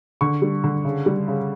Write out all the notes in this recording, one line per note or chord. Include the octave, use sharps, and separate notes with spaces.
D3 C#6
G3
D3
C#3
G3
C#3